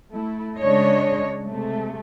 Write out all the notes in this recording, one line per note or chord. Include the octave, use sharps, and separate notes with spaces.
A3 E4
C#3 G#3 D4 C#5 D#5
C3 G#3 A3